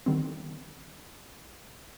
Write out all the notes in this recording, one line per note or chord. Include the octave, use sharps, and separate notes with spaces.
D3 D#3 G3 B3 C4